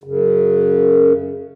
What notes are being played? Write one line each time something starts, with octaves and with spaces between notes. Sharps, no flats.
F#2 C#3